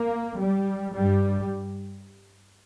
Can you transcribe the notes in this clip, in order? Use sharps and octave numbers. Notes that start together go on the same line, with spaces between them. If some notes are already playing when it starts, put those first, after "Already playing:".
Already playing: A#3
G3
G2 G3